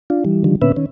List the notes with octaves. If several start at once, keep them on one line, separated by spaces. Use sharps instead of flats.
D4 F4
E3 G3
D3 D#3 F3 G3
A#2 D3 B3 C#4 B4 E5
D#3 C#4